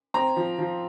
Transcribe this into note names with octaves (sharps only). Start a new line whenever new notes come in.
C4 A#5
F3
F3